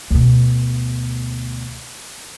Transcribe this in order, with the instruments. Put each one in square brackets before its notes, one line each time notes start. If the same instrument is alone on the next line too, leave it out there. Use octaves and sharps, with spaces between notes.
[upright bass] D2 B2